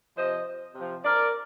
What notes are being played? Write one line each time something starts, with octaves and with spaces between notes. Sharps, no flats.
C3 F3 C5 D#5
C3 F3
A#4 D5